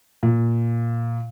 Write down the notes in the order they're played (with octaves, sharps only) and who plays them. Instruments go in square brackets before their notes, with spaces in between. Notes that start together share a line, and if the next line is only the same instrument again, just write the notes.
[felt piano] A#2